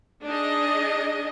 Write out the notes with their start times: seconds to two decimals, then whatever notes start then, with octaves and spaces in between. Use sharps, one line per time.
0.24 D4 D#4 G#4 D#5